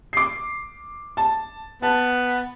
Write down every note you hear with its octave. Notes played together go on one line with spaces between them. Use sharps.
D6 C7
A5
B3 A5